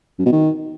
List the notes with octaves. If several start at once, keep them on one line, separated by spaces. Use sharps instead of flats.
F#2
B2
D#3